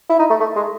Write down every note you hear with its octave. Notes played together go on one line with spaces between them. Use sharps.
E4
D#4
A3
A3
G#3